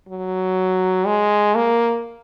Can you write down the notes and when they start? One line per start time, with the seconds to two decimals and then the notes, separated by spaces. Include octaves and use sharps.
0.08 F#3
1.06 G#3
1.56 A#3